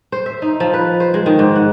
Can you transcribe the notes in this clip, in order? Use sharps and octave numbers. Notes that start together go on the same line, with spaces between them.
C5
E5
D#4
F3
B4
C5
G#3
D#3
G#2
F#5